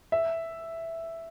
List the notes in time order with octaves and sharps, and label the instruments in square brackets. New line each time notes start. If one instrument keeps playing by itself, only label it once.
[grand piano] E5